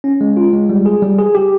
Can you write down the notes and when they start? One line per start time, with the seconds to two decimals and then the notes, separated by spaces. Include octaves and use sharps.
0.04 C#4
0.21 G#3
0.37 F4
0.53 G#3
0.69 G3
0.86 G#4
1.02 G3
1.19 G#4
1.35 G4